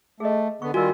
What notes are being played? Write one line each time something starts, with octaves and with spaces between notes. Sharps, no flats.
A3 G#4 D#5
D3 B3 C#6
D#3 G3 F4 F#4 A#4 G#5